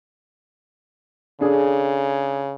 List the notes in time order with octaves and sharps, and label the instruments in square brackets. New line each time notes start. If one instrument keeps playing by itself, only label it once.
[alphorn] C#3 [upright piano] D4 G#4 A4